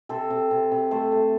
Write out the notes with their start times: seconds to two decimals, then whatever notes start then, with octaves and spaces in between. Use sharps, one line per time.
0.09 C3 A4 C5
0.30 C3
0.51 C3
0.72 C3
0.91 A3 A4 C5
1.12 A3